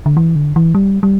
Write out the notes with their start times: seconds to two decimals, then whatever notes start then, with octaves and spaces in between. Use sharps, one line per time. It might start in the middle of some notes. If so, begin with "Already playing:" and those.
0.06 D3
0.17 E3
0.36 D3
0.56 E3
0.75 G3
1.03 G3